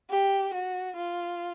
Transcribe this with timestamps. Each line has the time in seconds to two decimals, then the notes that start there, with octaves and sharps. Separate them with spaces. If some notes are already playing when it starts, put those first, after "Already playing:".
0.11 G4
0.54 F#4
0.96 F4